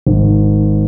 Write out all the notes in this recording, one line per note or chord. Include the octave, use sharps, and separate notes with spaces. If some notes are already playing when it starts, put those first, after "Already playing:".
G#1